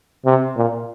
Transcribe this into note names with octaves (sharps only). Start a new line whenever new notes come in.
C3
A#2